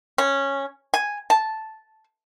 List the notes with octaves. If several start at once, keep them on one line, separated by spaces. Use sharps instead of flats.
C#4
G#5
A5